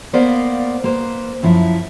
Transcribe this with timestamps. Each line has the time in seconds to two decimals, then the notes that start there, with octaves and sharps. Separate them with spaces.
0.13 A#3 B3 A#4 C5 D5 F5
0.84 A#3 B4 C5
1.43 F#2 F3 E4